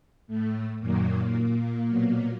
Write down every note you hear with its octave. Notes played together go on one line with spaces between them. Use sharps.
A2 A3
F#2 A#2 D#3 F#3 A#3
B2 F#3